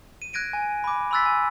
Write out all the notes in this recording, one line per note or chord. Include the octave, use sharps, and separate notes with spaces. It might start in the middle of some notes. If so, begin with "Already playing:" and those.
D#7
F#6 G#6 A#6 D7 D#7
G#5
B5 D6
B5 C6 E6 F#6 A6 B6
G#5